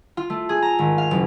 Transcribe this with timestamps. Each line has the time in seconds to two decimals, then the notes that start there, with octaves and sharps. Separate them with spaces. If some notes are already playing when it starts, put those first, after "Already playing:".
0.17 F4
0.30 A3
0.49 G#4
0.62 A#5
0.79 G#1
0.98 F5
1.11 F#1